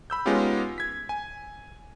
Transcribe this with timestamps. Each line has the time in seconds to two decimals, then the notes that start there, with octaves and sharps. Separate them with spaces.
0.10 B5 E6 G6
0.26 G#3 B3 C#4 D#4 F4 G4
0.78 G#6 B6
1.09 G#5